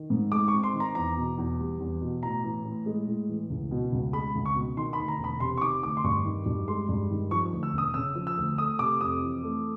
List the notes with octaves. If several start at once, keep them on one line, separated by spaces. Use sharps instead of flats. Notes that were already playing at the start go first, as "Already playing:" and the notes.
Already playing: D#3
G#2
G#3 D6
C#6
C4
C6
D#3
A#5
E2 A#5
B2
E2
G3
E2
B2
A2 A#5
E3
A2
G#3
A2
E3
C#2
B2
C#2
G#3 B5
C#2
C#6
B2
D#3 C6
B5
D2
A#5
E1 B5
C3 C6
C#6
D#3 D6
D2 D6
C6
G2 C#6
D#3
G2
G#3 C6
G2
D#3
F3 C#6
D2
E6
E1 D#6
C#3 E6
F3
E6
D2
A3 D#6
C3 D6
F2 D#6
E3
A3